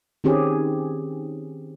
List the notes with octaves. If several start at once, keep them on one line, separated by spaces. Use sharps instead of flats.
D#3 C4 C#4 G4 G#4